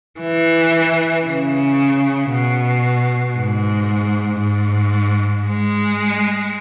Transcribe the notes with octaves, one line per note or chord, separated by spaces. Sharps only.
E3
C#3
B2
G#2
G#2
G#3